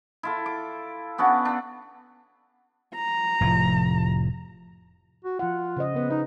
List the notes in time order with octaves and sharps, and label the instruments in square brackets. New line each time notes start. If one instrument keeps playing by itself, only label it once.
[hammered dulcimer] E4 F4 A4
D6
B3 C#4 D4 F#4
D4 F#5
[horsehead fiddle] A#5
[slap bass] F1 A2 F3
[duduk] F#4
[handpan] F3 F#5 [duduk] F4
[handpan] C#3 C5 D#5
[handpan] C#3 B4 [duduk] B3
[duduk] D#4 [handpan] D#5